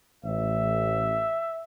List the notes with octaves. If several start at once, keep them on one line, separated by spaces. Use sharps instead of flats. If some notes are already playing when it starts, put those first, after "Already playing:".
A1 E5